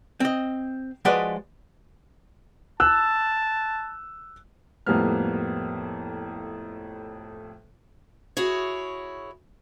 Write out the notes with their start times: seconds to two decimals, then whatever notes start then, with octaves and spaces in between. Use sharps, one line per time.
0.20 C4 D#5
1.05 F3 G#3 F#4 B4 D5 D#5
2.80 A5 E6 F#6
4.86 F2 A2 G3 A#3 B3 F6
8.37 E4 F#4 G#4 C#5